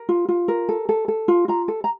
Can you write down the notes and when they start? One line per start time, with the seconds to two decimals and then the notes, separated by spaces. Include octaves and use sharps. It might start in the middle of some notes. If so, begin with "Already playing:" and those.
Already playing: A#4
0.09 F4
0.29 F4
0.48 A#4
0.69 A4
0.89 A4
1.08 A4
1.28 F4
1.48 F4 A#5
1.68 A4
1.84 A#5